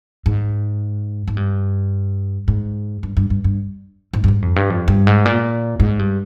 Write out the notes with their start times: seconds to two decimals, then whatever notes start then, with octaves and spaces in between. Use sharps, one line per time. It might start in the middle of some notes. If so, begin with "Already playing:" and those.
0.26 G#2
1.28 G#2
1.37 G2
2.48 G#2
3.03 G2
3.17 G2
3.30 G2
3.44 G2
4.13 G#2
4.24 G2
4.28 G#2
4.42 F2
4.56 G2
4.70 F2
4.88 G2
5.07 G#2
5.25 A#2
5.80 G#2
5.99 G2